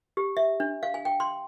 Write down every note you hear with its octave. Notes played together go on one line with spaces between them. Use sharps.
G4
E5
D4
F5
G#5
G5
C6